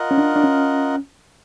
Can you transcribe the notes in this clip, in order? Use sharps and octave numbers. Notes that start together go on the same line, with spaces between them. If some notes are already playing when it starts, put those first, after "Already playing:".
Already playing: F4 A#4 D#5 F#5
C#4
D4
D4
C#4